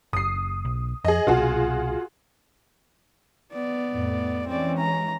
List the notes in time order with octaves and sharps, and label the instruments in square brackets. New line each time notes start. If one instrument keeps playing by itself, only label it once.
[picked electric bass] F#1 [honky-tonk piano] D#6 C7
[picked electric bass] B1
[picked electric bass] F2 [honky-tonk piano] G#4 D#5
[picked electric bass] C2 B2 [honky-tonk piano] F4 F#4 G#4
[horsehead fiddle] B3 D5
[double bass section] F2 A2
[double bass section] E3 G#3 C#4 [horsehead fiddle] C4 D5
[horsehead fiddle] A#5